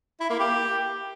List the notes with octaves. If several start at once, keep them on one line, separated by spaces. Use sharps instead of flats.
E4
A#3
G4